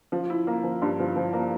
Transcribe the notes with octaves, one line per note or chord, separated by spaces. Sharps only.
F3
E4
A#3
F3
G2
F3
F3
A#3